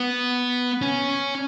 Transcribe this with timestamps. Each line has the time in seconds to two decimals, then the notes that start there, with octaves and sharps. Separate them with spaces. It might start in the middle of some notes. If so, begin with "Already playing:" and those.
Already playing: B3
0.81 C#4